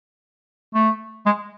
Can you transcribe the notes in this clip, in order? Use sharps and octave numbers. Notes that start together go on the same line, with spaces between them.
A3
G#3